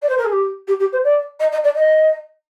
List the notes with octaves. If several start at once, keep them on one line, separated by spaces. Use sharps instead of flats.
D5
C5
A#4
G#4
G4
G4
G4
C5
D5
D#5
D#5
D5
D#5